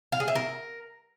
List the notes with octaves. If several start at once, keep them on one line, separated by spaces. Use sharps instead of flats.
F5
G#4
E5
A#4